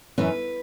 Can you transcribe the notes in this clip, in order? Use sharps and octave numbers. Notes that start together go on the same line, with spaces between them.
F#2 E3 C#4 B4